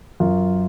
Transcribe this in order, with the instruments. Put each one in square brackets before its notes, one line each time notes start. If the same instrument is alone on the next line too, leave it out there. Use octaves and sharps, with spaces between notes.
[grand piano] F#2 F4